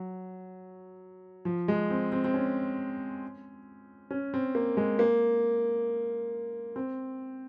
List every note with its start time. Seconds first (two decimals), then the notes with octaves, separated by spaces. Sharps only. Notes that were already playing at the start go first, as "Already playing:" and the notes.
Already playing: F#3
1.45 F3
1.68 G#3
1.90 C4
2.12 C4
2.24 C4
2.34 C#4
4.11 C#4
4.34 C4
4.55 A#3
4.77 G#3
4.99 A#3
6.76 C4